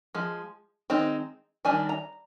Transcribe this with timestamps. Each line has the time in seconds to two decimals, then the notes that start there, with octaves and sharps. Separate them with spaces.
0.15 F3 G#3
0.90 D#3 G#3 C4 D#4
1.65 D#3 G3 D4 G#5
1.89 A#5